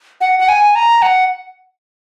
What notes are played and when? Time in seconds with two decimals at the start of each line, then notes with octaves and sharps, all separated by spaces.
0.21 F#5
0.40 F#5
0.48 G#5
0.75 A#5
1.02 F#5